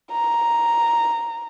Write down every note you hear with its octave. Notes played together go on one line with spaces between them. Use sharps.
A#5